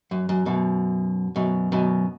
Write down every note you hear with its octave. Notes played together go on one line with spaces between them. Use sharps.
F#2
F#2
F#2 B2
F#2 B2
F#2 B2